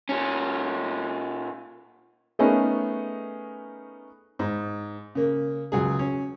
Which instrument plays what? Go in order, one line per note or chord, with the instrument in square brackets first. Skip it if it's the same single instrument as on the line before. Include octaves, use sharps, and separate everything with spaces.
[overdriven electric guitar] A#2 C#4
[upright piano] A3 B3 C#4 D#4 G#4 A#4
[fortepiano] G#2
C#3 A#3
C#2 F#3 G#4
C#4